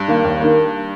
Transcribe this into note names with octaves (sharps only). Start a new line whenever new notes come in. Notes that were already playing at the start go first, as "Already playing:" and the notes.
Already playing: G2
D#3 A#3
D#2
D#3 A#3